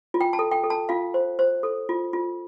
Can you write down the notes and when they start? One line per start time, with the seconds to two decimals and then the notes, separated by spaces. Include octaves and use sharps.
0.14 F4
0.21 G5
0.33 A5
0.39 A4
0.51 G5
0.64 A4
0.70 A5
0.89 F4 F5
1.14 C5
1.39 C5
1.63 A4
1.89 F4
2.13 F4